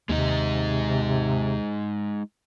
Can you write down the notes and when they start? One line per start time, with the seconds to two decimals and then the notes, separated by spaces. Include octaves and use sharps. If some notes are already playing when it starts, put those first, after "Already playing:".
0.09 D#2 C3 G#3 D#4 D#5